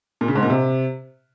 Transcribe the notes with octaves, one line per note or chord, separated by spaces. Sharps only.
A#2
C#3
G#2
A#2
C3